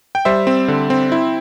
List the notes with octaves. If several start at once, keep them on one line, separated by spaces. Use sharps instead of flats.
G5
G3 C5 E5
C4
D3
C4
E4